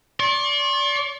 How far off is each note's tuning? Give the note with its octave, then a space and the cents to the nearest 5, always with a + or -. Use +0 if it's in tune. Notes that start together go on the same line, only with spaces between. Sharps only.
D5 -25 C6 +45